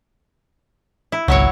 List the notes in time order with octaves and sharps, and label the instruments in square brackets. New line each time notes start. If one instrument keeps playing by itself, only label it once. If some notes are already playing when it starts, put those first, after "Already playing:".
[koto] E4
[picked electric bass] G#1 C#2 [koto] F#3 E4 C#5